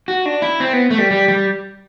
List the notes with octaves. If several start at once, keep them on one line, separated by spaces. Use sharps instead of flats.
F#4
D4
E4
C4
B3
A3
G3
G3
G3